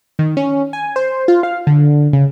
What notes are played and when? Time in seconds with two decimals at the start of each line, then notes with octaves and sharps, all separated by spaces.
0.19 D#3
0.37 C#4
0.73 G#5
0.96 C5
1.28 F4
1.43 F5
1.67 D3
2.13 C#3